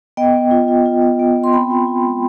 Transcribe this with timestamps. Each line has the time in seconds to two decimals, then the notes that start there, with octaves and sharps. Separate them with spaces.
0.17 B3 D#5 G5
0.34 B3
0.51 F4
0.68 F4
0.86 F4
1.02 B3
1.20 B3
1.36 B3
1.44 C6
1.53 C4 G5 B5
1.71 F4
1.87 F4
2.04 G#3